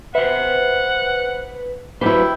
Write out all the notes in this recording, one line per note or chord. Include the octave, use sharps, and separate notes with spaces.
B4 C5 E5 F#5
F#3 A3 E4 G4 B4 C5